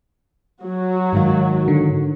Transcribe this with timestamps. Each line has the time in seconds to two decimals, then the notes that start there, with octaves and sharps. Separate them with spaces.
0.63 F#3 F#4
1.13 G#2 D#3 F5
1.68 D3